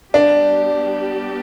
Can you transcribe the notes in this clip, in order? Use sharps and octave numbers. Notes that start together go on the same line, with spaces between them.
G3 B3 D4 G4